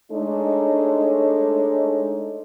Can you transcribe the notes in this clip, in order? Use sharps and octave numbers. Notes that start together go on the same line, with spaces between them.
G#3 A3 D4 D#4 A4 C#5